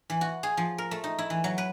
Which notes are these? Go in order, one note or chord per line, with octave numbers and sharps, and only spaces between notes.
E3
F#4
G#4
F3
A#4
A3
D#4
E4
E3
F#3
B4